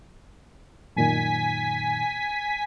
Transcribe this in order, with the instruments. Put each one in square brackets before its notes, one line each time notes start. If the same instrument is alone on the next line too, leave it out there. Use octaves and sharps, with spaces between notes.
[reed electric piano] F#2 A#2 D#3 [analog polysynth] G#5 B6